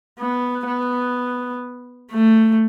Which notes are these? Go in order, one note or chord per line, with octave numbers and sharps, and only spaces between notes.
B3
B3
A3